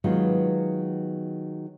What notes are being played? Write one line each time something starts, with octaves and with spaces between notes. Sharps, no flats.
D#3 F#3 G#3 B3 F4